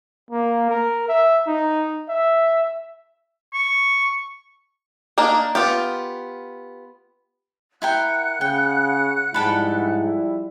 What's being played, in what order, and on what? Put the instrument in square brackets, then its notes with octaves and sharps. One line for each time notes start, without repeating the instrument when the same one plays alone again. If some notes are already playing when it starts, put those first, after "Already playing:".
[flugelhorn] A#3
A#4
E5
D#4
E5
[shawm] C#6
[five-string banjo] A#3 D4 D#4 A#4
B3 F4 G4
[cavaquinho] E4 A#4 G5 [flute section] F#5 F#6
[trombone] C#3 [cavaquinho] G5
[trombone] G#2 [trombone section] F3 G3 E4 [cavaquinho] G5 A5 B5